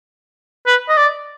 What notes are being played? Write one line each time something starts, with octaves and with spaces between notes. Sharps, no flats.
B4
D#5
D5